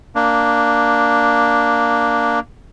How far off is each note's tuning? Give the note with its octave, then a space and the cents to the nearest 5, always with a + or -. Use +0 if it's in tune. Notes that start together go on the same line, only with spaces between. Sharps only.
A#3 +0 D4 +0